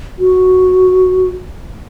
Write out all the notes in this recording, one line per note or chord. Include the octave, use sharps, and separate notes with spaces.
F#4